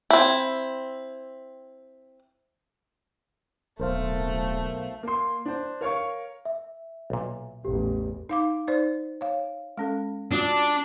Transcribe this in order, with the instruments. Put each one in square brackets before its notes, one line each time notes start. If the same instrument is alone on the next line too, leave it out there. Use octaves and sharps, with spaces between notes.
[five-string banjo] C4 E4
[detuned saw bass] D1 [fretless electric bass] B1 [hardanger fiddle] A3 [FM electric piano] A#4 C5 F5
[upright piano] A#3 C6
D4 C5
A#4 C#5 F5 C#6
[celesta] E5
[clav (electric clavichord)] B1 A#2
[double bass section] A1 E2 [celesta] G4
[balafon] D#4 F5 D6
D#4 C5 D5
C#5 F5
G#3 C#4 A4
[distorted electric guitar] D4 [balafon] F4 F#4